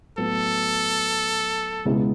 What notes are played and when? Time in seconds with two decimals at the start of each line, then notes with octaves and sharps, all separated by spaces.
0.18 A2 F#3 B3 A4
1.85 C#2 B2 G#3 B3 E4